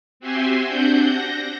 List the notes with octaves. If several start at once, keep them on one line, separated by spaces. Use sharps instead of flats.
C4 F#4 G4 E5 G#5 C6
C4 D4 F#5 G6
A#6